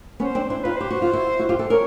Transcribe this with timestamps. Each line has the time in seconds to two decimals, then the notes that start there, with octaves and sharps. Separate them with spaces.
0.20 B3 C#4 C5
0.35 C4 D4
0.49 D4 E4 C5
0.63 D#4 F4 B4
0.76 G4 C5
0.90 F#4
1.02 F4
1.13 E4 F#4
1.39 E4 F#4
1.49 F4 G4
1.59 G4 A4
1.70 G#4 A#4 C#5